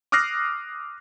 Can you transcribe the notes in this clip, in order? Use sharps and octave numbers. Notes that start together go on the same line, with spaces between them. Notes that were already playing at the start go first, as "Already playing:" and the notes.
D6 D#6 F6 F#6 A#6 C7